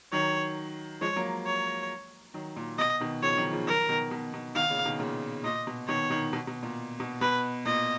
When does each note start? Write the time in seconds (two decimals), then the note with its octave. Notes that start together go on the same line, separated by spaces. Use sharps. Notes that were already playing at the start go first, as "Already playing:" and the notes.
0.12 D#3 F#3 C#5
1.01 F3 G#3 C#5
1.16 F#3 A#3
1.46 C#5
2.34 D#3 F#3
2.56 A#2
2.79 B2 D#5
3.00 B2 D#3
3.22 C#3 F3 C#5
3.37 D#3 F#3
3.53 C#3 F3
3.66 D#3 F#3 A#4
3.89 B2 D#3
4.11 B2
4.34 B2
4.55 B2 D#3 F5
4.70 A#2 C#3
4.85 B2 D#3
4.99 A#2 C#3
5.44 A#2 D#5
5.67 B2
5.88 B2 D#3 C#5
6.10 B2 D#3
6.33 B2
6.47 B2
6.63 A#2
7.00 B2
7.21 B2 B4
7.66 A#2 D#5